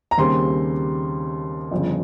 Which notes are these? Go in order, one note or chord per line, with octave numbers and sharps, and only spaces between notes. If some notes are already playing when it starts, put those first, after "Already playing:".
A#5
D#2 C#3 G3 C4 C6
G1 F2 C#3